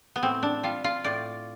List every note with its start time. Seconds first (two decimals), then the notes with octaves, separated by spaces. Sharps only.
0.16 B3
0.23 A2 C4
0.43 D4
0.63 G3 F4
0.84 F4
1.04 A2 D5